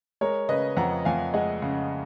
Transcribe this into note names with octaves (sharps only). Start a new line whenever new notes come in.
G#3 A#4 C#5
C#3 B4 D#5
F2 F#5 A#5
F2 F5 G#5
G#3 D#5 F#5
C#3